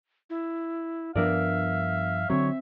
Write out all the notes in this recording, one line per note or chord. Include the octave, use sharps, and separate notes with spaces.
E4
G2 F3 B3 D4 A#4 D5 E5 F5
D3 F#3 C4 C#5